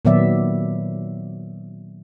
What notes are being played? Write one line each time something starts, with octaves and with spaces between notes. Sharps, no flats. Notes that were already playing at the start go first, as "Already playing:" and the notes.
A#2 D#3 F#3 B3 D5 E5